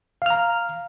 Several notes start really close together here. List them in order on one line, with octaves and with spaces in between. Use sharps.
F5 F6 A#5